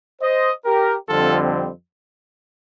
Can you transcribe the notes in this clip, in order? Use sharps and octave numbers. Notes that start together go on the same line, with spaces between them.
C5 D#5
G4 A#4
F2 D3 G3 C4 F4 A4